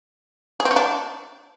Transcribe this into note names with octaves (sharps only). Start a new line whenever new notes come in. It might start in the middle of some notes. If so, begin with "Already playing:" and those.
G#4
C4
C#4
D4